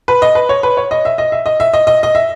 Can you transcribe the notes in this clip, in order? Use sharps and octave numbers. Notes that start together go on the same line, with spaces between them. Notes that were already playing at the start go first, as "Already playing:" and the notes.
B4
D#5
B4
C#5
B4
C#5
D#5
E5
D#5
E5
D#5
E5
D#5
D#5
D#5
E5